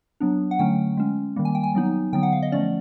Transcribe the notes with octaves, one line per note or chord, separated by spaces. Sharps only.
F#3 B3 D4
F#5
D3 F#3 A3 C#4 G5
G#3 C#4
D#3 G3 A#3
G#5
G5
G#5
F#3 B3 D#4
D3 F#3 B3 G5
F#5
F5
D#5
F3 A3 C#4 D5